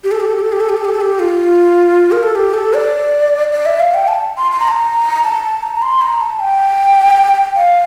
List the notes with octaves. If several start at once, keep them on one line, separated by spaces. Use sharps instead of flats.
G4
A4
G4
A4
G4
A4
G4
A4
G4
A4
G4
A4
G4
F4
A#4
A4
G4
A4
D5
D5
E5
F5
G5
A5
C6
C6
A#5
A5
A#5
A5
A5
A#5
A#5
C6
A#5
A5
G5
F5